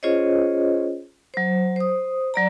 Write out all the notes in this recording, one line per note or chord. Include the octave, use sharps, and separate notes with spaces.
C#4 F4 G#4 C5 C#5 D#5
F#3 C5
C5 D#6
F#3 D5 A#5